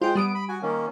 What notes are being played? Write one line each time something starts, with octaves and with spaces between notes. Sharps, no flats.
G#3 F4 C5 G5
G3 B3 D#6 D7
B5
F#4 G#5
D#3 A#3 C#4